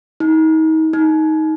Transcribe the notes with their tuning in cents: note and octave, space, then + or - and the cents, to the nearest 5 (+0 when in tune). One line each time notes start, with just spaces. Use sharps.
D#4 +35
D#4 +15